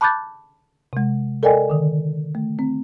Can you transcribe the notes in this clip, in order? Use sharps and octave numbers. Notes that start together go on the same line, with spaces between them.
A5 B5 D6 F#6 G6 A6
C3 G#3
A4 A#4 D5 D#5 G5 G#5
D3 D#3
A3
C4